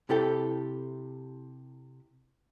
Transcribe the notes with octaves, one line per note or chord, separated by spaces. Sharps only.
C3 E4 G4 A4 G5